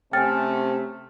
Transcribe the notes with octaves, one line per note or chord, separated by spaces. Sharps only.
C3 A3 C#4 G5 G#5 F6 A6